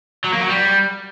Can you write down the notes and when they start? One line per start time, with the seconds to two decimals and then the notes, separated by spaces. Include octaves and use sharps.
0.24 F#3
0.32 A#3
0.41 F#3
0.49 G3